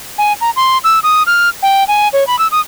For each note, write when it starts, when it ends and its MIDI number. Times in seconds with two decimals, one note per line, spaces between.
0.18 0.33 80
0.41 0.50 82
0.56 0.78 84
0.84 0.99 88
1.03 1.23 87
1.27 1.49 89
1.63 1.84 79
1.88 2.08 80
2.13 2.26 73
2.27 2.38 83
2.39 2.47 88
2.51 2.60 87